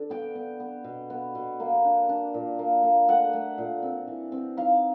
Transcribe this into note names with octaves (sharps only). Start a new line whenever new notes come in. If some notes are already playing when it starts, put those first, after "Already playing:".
Already playing: D3
B3 G5
B3
B3
B2
B3
B2
A#3
D4
D4
A#2
A#3
A#3
A3 F#5
A3
A#2
C4
E3
C4
D#4 F5